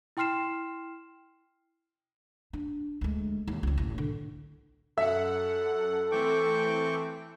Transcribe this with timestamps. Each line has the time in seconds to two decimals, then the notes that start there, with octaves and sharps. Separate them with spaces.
0.17 E4 G5 C6 F6 C7 E7
2.53 D4
3.01 D2 G#3
3.47 D#2
3.63 C#2 C4
3.78 A1
3.98 D3
4.98 F#2 A4 E5 F#5
6.11 E3 A3 C4 G5 C#6 D6